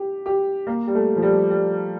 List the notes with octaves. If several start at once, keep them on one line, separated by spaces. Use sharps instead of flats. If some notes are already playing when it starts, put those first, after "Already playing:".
Already playing: G4
G4
A#3
G3
A3
F3
G3
G3